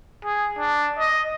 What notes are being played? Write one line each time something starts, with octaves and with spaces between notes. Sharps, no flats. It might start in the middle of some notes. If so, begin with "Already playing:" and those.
G#4
D4
D#5